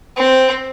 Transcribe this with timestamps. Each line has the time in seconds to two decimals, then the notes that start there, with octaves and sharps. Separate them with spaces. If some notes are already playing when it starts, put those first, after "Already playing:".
0.17 C4